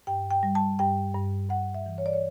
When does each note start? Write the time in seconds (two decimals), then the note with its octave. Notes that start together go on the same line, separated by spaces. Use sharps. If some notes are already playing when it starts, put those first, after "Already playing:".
0.07 G2 G5
0.31 G5
0.43 G3
0.55 A5
0.79 G2 G5
1.15 G2
1.50 G2 F#5
1.74 E5
1.86 E3
1.98 C#5
2.06 D5
2.13 C#5